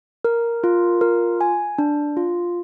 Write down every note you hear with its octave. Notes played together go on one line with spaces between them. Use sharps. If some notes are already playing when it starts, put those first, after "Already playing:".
A#4
F4
A#4
G#5
D4
F4